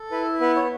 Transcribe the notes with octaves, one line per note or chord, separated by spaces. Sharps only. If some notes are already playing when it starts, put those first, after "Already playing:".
Already playing: A4
E4 B4
B3 B4
C#5